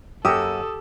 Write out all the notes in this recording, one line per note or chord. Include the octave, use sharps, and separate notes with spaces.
F#2 A#3 F#4 G4 A4 D#6 E6